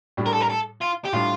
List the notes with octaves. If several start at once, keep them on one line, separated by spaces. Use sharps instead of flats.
A2 G3 D4
A#4
A4
A#4
A4
F4
G4
A2 G3 D4 F4